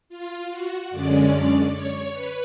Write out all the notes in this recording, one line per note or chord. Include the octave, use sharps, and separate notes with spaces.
F4
F#4
F#2 D3 G#3 C#4 D5
C#5
B4